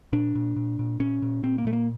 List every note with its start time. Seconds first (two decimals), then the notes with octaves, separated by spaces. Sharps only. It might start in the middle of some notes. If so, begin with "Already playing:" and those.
0.13 A#2 D4
0.35 A#2
0.56 A#2
0.79 A#2
1.00 A#2 C#4
1.22 A#2
1.43 A#2 C4
1.58 A#3
1.65 A#2 A3
1.73 A#3